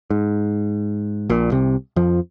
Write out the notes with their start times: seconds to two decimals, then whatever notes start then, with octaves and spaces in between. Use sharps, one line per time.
0.10 G#2
1.30 A#1 A#2
1.52 C2 C3
1.96 F2 F3